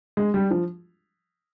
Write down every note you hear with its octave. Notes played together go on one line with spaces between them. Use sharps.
G#3
G3
F3